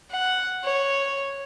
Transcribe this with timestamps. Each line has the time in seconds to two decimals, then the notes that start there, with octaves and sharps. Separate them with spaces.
0.11 F#5
0.64 C#5